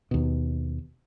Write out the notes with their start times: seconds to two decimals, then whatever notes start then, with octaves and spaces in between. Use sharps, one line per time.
0.11 D#2 B2